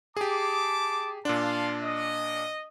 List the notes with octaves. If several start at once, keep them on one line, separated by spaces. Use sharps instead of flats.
G4 G#4 A5 D6
A#2 D4 F5 A5 C6
D#5